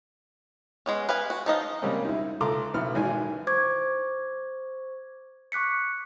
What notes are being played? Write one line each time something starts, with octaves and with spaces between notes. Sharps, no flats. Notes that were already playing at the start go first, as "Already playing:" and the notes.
G#3 B3 C#4
B4 F5 G#5
F#4
F3 D#4 D#5 F5
C#3 G3 G#3 A#3 C4 C#4
D#4 E4
C#2 A4 A#5 C6 D6
B1 A2 B3 E4 F6
G#1 B2 E3 G#3 D#4 G#5
D#3
C5 C#6 D6 G#6
C#6 D6 F#6 B6 C#7